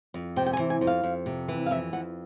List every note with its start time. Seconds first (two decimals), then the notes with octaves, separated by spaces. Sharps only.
0.14 F2
0.36 C3 G5
0.46 G5
0.53 G#5
0.59 E3
0.70 G#5
0.81 F2
0.87 F5
1.03 F2
1.26 C3
1.48 E3
1.66 F5
1.71 F2 E5
1.93 F2 F#5